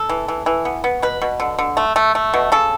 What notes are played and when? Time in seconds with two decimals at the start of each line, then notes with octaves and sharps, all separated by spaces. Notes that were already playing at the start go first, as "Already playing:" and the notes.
Already playing: A4
0.09 E3
0.28 E3
0.46 E3
0.65 B3
0.84 B3
1.02 B2 B4
1.22 B2
1.40 D3
1.59 D3
1.77 A3
1.96 A3
2.15 A3
2.34 B2
2.52 C#3 A4